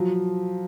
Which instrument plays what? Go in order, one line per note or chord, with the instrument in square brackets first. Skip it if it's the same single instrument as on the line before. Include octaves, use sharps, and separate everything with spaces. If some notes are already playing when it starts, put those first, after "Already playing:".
Already playing: [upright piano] F3 F#3